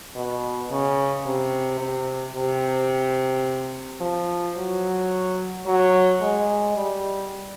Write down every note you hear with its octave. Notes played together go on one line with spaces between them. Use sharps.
B2
C#3
C3
C3
C3
F3
F#3
F#3
G#3
G3